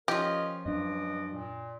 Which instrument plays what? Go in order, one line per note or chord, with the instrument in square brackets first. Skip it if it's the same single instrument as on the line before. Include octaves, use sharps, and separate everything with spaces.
[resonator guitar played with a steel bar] F3 C#4 F4 [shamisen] G4 [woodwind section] A#4 D#5
[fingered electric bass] F#2 D4 [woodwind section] B4 D5 D#5
[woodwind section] A#2